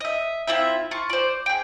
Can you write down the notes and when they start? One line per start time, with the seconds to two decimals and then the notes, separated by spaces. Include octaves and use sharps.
0.01 D#5 E5
0.47 C4 E4 F4 E5
0.91 F4 C#6
1.10 C5 D5
1.46 G#4 G5